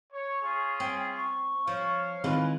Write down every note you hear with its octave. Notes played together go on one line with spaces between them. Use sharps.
C#5
C#4 F4 G#4 C#6
C4 G5
C#6
F3 C#5 F5
D#3 E3 G#3 C4 F4 B5